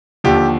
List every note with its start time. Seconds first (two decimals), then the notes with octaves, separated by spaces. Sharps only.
0.24 D#2 D3 F3 G4